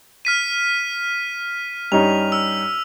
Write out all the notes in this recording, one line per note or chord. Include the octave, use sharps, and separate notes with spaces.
F6 B6 D#7
G2 C#4 D#4 F7
E6